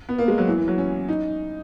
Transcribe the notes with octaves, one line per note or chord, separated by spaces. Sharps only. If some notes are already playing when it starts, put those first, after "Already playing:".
B3
A#3
G#3
F#3
E3
E3
F#3
C#4
D#4